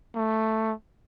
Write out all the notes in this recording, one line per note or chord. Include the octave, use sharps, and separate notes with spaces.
A3